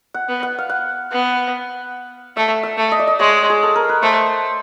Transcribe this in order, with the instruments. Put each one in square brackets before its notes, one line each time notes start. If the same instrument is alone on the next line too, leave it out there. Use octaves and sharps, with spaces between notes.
[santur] F#5
[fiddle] B3
[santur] F#5
F5
F#5
[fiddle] B3
[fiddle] A3 [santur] E5
[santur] E5
[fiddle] A3
[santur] D#5
D5
D#5
[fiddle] G#3 [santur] C#5
[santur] G#4
A4
A#4
B4
[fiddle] A3 [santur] C5